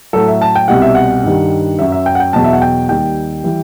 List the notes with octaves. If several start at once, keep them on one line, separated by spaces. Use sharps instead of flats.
A2 F#3 A4
E5
A5
G5
C2 B2 G3 F#5
E5
F#5
G2 D#3 G3
F#2 F#3 E5
E5
G5
F#5
G5
E2 B2 F#3 A5
E5
F#5
G5
D#2 D#3 G3 G5
E3 G3